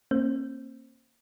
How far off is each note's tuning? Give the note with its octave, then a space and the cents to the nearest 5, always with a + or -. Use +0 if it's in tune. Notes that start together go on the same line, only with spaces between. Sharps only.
A#3 +0 C#4 -45 C5 +15